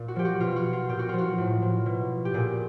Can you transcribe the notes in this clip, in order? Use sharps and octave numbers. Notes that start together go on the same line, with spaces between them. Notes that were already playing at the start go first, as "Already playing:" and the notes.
Already playing: A#2
F#4
F3 G4
F#4
B2 F4
F#4
F4
A#2 G4
F#4
F3 F4
F#4
A2
F3
B2
G4
A#2 G#4